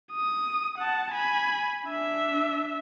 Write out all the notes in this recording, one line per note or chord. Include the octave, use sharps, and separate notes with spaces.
D#6
F#5 A5
G#5 B5
D4 E5